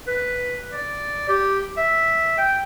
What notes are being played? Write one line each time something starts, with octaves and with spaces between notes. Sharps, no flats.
B4
D5
G4
E5
G5